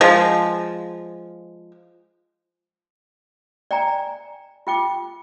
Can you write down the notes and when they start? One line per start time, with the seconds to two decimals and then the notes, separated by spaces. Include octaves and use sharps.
0.01 F3 G#3
3.71 D5 G5 G#5 A#5
4.67 F4 G5 D6